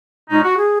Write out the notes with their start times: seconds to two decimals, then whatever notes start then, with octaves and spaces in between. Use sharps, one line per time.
0.30 A#2 G#3 C#4 D#4
0.43 F#4
0.56 G#4